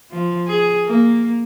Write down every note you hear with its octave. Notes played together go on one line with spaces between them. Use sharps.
F3
G#4
A#3